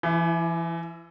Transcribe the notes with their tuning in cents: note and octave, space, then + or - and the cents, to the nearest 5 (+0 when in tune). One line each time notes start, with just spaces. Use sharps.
E3 +35 E4 +0